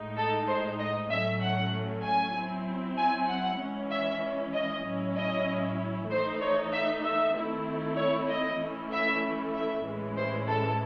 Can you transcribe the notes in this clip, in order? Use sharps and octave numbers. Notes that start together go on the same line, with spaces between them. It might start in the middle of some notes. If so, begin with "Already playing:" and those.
Already playing: A2 G#3 D#4
A4
C5
D#5
A2 F#3 A3 C#4 E5
F#5
G#5
F#3 C4 E4
G#5
F#5
E3 G#3 C#4 E4
E5
D#5
A2 F#3 C#4 E4
D#5
E3 A3 D#4 C5
C#5
E5
E5
D#3 A3 C4 E4
C#5
D#5
E3 A3 C#4 E4
E5
E5
A2 E3 G#3 C#4 E4
C5
A4